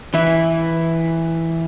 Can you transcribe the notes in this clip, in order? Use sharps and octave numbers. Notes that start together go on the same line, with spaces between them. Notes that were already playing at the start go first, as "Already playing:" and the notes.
E3 E4